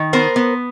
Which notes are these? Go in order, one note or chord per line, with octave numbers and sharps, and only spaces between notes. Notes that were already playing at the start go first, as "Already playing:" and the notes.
Already playing: D#3
B3 A#4 C5
B3